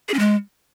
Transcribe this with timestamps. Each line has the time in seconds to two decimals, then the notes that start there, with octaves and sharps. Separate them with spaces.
0.09 G#4
0.14 C#4
0.19 G#3